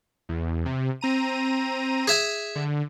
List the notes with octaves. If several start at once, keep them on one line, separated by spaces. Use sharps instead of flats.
E2
C3
C4 A#5 D#7
G#4 E5 G#5
D3